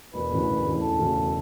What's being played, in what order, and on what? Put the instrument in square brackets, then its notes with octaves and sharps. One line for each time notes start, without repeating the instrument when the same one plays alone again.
[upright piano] E1 [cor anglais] B4
[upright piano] D2 C#3 E3
E1
D2 C#3 E3
[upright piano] E1 [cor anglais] A4
[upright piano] D2 C#3 E3
E1